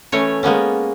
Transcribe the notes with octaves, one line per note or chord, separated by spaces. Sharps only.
E3 A3 C#4 C#5
G#3 A#3 B3 C#4